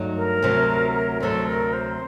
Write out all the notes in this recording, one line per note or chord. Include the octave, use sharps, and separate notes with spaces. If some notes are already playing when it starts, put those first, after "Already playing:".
Already playing: G2 F#3 A3 D#4
A#4
D2 C3 F#3
D2 C3 F#3 A4
A#4
C5